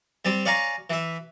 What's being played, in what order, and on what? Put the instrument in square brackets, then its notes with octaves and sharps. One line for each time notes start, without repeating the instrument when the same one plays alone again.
[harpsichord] G3 C4 D5
C#5 D5 F5 G#5 A#5 C#6
E3 E5